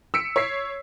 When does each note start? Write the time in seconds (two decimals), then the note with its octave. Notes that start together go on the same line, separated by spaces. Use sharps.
0.14 E6 B6 C#7 D7
0.36 C#5 B6 C7